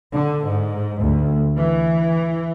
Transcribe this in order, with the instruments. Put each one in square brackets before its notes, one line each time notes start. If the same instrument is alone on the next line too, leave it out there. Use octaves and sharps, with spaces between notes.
[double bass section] D3
G#2
D2
E3